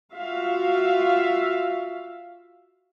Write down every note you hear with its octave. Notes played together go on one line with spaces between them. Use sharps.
F4 F#4 E5 F5